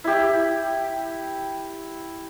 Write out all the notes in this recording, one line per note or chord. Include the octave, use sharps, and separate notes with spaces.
E4 G4